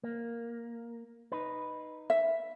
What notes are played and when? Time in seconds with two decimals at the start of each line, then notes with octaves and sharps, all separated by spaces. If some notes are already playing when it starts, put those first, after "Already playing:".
0.04 A#3
1.32 D#4 B4
2.10 E5